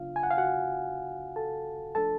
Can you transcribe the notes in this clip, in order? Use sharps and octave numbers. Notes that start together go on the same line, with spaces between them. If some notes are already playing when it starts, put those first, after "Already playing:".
Already playing: C#3 F#3 B3 D4 F4 F5
G#5
F#5
F5
F#4 F#5
A4 A5
F3 A3 D4 A4 A5